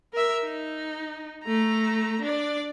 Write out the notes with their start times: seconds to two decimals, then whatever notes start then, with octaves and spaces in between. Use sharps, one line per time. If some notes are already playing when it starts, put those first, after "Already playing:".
0.13 A#4 E5
0.44 D#4
1.44 A3 A#5
2.21 D4 D5